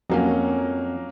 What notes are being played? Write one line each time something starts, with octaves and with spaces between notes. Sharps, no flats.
F2 F#3 A#3 C#4